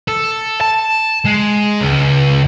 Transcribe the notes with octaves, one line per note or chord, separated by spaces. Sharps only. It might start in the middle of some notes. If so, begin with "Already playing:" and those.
A4
A5
G#3
C#2